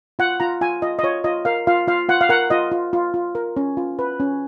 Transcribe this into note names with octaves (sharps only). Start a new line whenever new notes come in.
F4 F#5
F4 A#5
F4 G#5
F4 D#5
D#5
F4 C#5
F4 D#5
A#4 F5
F4 F5
F4 F5
F4 F#5
F5
A#4 F#5
F4 D#5
F4
F4
F4
A#4
C#4
F4
B4
C#4